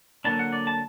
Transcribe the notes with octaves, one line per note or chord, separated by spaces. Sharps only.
D3 F#3 A#3 D4 A5
F#5
D5
A5